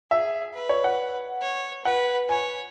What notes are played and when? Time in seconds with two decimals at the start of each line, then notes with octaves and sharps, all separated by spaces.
0.11 G#4 E5
0.54 B4
0.69 C#5
0.84 F#5
1.42 C#5
1.85 B4 F#5
2.28 C#5 G#5